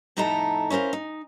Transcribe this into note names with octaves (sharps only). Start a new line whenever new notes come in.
F2 A2 D#4 E4 A4 A#5
C#4 E4 A#4 C5 F5
D#4